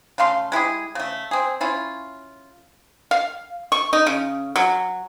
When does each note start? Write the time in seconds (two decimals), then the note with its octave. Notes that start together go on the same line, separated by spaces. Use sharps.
0.18 C#3 A3 F5 C6
0.52 G#3 E4 G4 G#4
0.95 C#3 A3
1.31 C4 G#4
1.61 C#4 E4 F4
3.11 F5
3.72 C#6
3.93 D#4
4.06 C#3
4.56 F#3